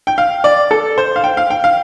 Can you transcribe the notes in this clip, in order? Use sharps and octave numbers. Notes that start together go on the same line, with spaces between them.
G5
F5
D5
A4
C5
F5
G5
F5
G5
F5